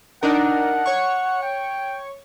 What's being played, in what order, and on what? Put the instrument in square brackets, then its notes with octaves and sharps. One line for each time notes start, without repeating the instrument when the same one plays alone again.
[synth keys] D4 D#4 A#4 [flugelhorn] F#5
[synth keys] C#5 C#6
[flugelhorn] G5